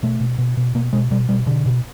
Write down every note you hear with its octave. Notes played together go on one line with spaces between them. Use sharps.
B2 A3
B2
B2
B2
B2 A#3
B2 G#3
B2 G3
B2 G3
B2 D3
B2